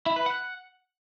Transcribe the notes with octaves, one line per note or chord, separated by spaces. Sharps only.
E4
B4
F#5